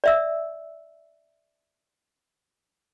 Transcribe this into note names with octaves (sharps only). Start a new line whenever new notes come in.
D5 E5 E6